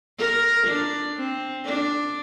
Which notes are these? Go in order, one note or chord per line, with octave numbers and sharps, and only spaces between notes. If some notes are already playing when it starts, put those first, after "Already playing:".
A#4
D4
C4
D4